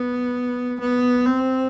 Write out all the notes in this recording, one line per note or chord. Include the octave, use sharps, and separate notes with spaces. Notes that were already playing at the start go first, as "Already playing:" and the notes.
Already playing: B3
B3
C4